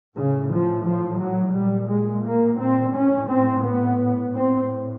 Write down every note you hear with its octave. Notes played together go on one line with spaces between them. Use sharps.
A2 C#3
F3
F3
F#3
A#2 G3
G#3
A#3
C4
A2 C#4
C4
B3
A2 C4